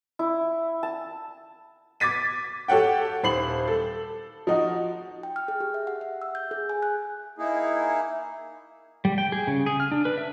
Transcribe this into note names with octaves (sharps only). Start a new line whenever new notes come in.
E4
A5
D6 G#6 A6 B6 D#7
G4 A4 C#5 F#5 G5
D#1 C5 B5 C7 F#7
A4
F3 D#4 F#4
G5
F6
G#4
G4
E5
F#5
E5
E6
G6
G#4
G#5
F#6
A#3 D#4 E4 G#4
G3
G5
G#4
C#3
G#4
F6
D4
B4
E5